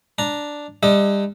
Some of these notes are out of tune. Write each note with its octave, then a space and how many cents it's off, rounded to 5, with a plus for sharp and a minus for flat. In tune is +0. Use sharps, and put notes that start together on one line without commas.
D4 +0 A#5 +0
G3 +30 D4 +35 D#5 +40